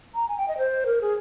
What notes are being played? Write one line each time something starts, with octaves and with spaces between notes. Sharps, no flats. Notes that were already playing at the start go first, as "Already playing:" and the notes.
A#5
G#5
G5
D#5
C5
A#4
G#4